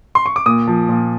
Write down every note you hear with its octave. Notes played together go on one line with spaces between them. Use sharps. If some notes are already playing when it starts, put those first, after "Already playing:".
C6
C#6
D6
A#2 D#6
F3
A#2